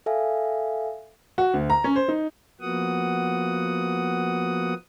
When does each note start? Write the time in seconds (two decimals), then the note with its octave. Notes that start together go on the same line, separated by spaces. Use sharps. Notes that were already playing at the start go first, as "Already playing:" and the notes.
0.06 A4 E5 F5 G#5
1.38 F#4
1.54 D2
1.70 A#5
1.84 C#4
1.96 C5
2.08 D#4
2.61 F3 A#3 B3 F#4 F#5 D#6